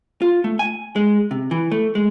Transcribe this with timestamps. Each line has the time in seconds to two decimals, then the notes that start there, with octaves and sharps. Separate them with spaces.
0.22 F4
0.44 A3
0.59 G#5
0.96 G#3
1.31 C3
1.51 E3
1.72 A3
1.95 G#3